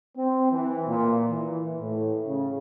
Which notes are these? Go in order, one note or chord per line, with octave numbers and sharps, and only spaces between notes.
C4
E3
A#2
E3
A2
C#3